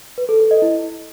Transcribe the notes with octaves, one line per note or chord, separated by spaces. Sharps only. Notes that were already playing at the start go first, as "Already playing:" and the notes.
B4
A4
A4
D#5
E4